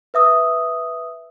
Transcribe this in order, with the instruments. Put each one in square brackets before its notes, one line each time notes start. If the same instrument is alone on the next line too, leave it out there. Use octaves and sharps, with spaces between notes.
[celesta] B4 E5 D#6 E6